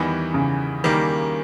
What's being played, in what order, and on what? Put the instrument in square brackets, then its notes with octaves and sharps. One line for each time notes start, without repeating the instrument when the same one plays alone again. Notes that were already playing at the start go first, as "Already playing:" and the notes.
Already playing: [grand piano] E2 D#3 G3 B3 D#4 [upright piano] E3
[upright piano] C#3
[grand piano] D#3 G3 A#3